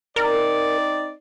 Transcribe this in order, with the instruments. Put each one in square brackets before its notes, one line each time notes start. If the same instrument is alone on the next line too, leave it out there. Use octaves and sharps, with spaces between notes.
[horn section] C4 D#4 D5 [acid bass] A#4